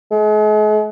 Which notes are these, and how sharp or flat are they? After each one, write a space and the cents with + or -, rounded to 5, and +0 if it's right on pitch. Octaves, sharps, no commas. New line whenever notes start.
G#3 +40